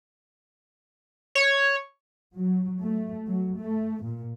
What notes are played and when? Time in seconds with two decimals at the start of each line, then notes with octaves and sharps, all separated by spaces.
1.35 C#5
2.36 F#3
2.81 A3
3.27 F#3
3.60 A3
4.04 A#2